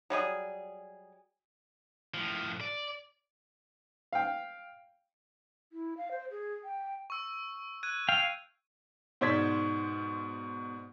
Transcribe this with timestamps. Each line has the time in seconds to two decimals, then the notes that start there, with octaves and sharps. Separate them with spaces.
0.10 F#3 G3 G#4 D#5
2.14 A2 F3
2.61 D5
4.13 F5 G5
5.73 E4
5.97 F5
6.11 C5
6.31 G#4
6.64 G5
7.10 C#6 E6
7.83 F#6 G#6 D#7
8.08 F5 G5
9.21 G#2 B2 C5 D5 G#6 B6